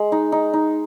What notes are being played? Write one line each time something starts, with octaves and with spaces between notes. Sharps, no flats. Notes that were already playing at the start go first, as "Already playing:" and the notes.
Already playing: G#3
D#4
D#4
D#4